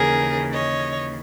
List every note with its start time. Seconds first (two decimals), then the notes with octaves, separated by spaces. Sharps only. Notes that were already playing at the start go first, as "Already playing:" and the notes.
Already playing: D#2 C#3 E3 G#4 A#4
0.54 C#5 D#5